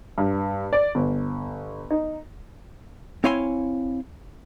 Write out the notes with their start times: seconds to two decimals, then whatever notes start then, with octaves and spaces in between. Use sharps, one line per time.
0.18 G2
0.73 D5
0.95 G1
1.90 D#4
3.24 C4 E4 C#5 F5 G#5 C6